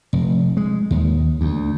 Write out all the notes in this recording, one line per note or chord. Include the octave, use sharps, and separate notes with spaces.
F1
G#3
D#2
D2